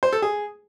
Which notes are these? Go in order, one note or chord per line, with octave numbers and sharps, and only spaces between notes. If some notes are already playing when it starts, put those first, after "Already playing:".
C5
A4
G#4